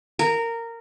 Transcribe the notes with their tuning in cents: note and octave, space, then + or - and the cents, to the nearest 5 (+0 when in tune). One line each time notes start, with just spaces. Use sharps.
A#4 -15